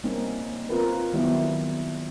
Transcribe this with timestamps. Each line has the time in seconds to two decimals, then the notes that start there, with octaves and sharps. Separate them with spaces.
0.04 G3 A#3 C4 C#4 D#4
0.69 C4 F4 A#4 B4
1.13 D#3 F#3 G3 B3 E4 G4